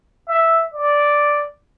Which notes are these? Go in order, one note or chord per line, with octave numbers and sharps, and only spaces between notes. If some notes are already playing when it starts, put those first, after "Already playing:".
E5
D5